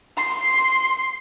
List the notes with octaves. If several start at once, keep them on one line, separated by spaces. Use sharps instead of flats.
C6